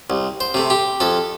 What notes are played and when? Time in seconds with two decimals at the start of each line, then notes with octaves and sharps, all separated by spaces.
0.10 C2
0.40 C5
0.54 C3 A3
0.70 G4
1.00 F2 A4